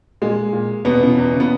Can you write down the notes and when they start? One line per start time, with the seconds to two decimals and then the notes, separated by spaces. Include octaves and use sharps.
0.22 A#2 G#3
0.53 A#2
0.85 E2 B2 B3
1.01 C#3 E3
1.18 E2
1.34 C#3 E3
1.40 B3